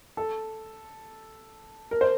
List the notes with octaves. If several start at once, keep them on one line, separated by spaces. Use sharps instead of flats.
A4
A#4
C5